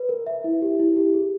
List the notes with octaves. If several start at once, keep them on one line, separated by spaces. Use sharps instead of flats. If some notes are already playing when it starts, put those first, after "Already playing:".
Already playing: B4
A#4
E5
E4
G4
E4
G4
G#4